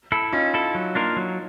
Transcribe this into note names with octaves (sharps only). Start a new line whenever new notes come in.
E4 A4
C#4 D#4 F4
E4 A4
F#3
A#3 D4 F4 A#4
F#3